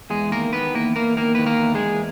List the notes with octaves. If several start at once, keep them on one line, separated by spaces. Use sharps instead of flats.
E2 G#3 G#4
D#3 A#3 A#4
D#3 B3 B4
E2 A#3 A#4
E2 A#3 A#4
D#3 A#3 A#4
D#3 B4
A#3 A#4
E2
G#3 G#4
E2